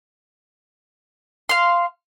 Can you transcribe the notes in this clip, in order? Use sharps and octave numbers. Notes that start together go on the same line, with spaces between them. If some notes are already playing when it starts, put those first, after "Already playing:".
F5 C6